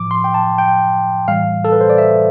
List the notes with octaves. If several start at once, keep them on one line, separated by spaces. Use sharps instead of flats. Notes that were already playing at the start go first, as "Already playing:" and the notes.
Already playing: A2 F3 D6
C6
G5
A5
G5
A2 E3 G3 F5
A4
B4
C5
D5
E5